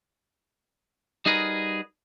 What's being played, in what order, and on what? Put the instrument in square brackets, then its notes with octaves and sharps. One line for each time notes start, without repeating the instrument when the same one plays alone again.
[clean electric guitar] G3 D#4 F#4 G#4 A#4 B4